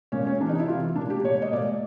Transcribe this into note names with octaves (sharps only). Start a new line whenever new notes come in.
A#2 C#4
C#4
C3 E3 D4
D#4
E4
C3 E3 F4
A#2 D4
G4
A#2 C#5
D#5
A#2 D5